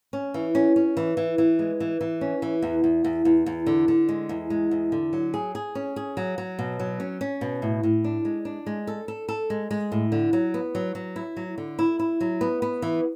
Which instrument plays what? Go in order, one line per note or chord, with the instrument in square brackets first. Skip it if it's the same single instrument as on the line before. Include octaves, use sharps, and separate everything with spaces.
[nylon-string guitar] C#4
E3
C#4
C#4
E3
E3
E3
G#3
E3
E3
C#4
E3
E2
E2
E2
E2
E2
D3
D3
G#3
E2
G#3
E2
D3
F#3
G#4
G#4
C#4
G#4
F#3
F#3
B2
F#3
C#4
C#4
B2
A2
A2
D4
G#3
D4
G#3
A4
A4
A4
G#3
G#3
A2
D3
F#3
B3
F#3
F#3
E4
F#3
D3
E4
E4
F#3
B3
B3
E3